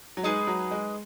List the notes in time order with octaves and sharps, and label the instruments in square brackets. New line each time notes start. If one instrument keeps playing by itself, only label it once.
[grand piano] F#3
[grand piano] G#3 [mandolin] D#4 G#4 B4
[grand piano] F#3
G#3